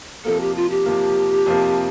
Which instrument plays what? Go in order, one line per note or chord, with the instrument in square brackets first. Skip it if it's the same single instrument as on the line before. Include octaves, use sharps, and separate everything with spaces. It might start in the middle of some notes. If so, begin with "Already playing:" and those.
[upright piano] F2 C3 F3 A#3 [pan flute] A4
[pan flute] G4
F4
G4
[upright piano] F2 C3 F3 A#3
F2 C3 F3 A#3